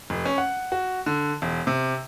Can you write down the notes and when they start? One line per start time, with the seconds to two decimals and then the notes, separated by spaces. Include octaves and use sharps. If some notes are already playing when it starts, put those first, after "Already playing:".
0.10 F1
0.25 C#4
0.38 F#5
0.72 F#4
1.06 D3
1.42 E1
1.67 C3